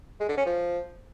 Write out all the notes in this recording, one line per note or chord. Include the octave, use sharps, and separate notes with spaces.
G#3
D3
C#4
F3